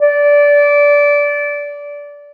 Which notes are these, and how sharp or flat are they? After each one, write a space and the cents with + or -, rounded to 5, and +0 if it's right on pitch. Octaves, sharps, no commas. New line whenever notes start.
D5 -20